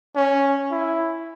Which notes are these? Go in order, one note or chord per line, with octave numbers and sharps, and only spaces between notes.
C#4
E4